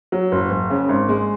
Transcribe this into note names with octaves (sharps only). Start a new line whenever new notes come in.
F#3
F#1
F#1
C#3
G#1
G#3